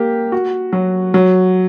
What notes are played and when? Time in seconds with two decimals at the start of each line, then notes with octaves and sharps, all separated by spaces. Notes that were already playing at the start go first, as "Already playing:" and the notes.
Already playing: A#3 G4
0.32 F#4
0.73 F#3
1.14 F#3